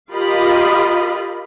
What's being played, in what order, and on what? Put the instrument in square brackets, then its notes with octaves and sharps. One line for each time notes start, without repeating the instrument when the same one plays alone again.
[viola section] F4 G4 A#4 D#5 F5 B5